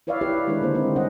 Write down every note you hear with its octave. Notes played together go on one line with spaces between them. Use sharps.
E4 B4 C#5 D5 E5 F5
E4 G4 B4
D#3 G#3 D4 D#4 B4
D3 A#3 C5
G#3 C4 C#4 D#4
C#3 G3 C#4 C5 D#5 F#5